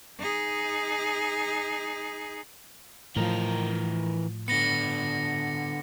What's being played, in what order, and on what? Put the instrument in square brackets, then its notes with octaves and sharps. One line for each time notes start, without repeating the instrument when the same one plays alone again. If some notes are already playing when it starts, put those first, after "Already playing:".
[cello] D#4 G#4
[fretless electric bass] A2 F3 [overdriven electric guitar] E3 A#4
[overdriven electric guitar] D3 B3 [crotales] A#6 C#7